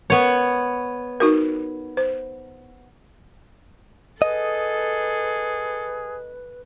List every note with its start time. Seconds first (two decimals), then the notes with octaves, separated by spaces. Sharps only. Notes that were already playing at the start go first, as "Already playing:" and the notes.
0.10 B3 C#5
1.20 D#4 F#4 A#4
1.97 C5
4.22 G#4 A4 B4 D#5